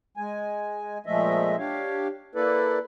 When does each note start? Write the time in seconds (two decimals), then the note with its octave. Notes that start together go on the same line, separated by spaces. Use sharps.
0.17 G#3 G#5
1.06 A#2 F3 G#3 A3 D#5 E5
1.59 D4 G4 C#5 F5
2.35 A#3 E4 A4 B4 D5